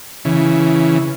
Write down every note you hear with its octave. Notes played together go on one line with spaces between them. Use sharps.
C#3 E3